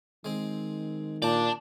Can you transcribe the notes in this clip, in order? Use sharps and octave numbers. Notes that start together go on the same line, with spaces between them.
D#3 G#3 C4
A#2 D5 G5 A5